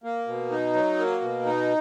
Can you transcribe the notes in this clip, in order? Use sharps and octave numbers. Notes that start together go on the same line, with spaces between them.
A#3
B2
D#4
F#3
A#3
B2
D#4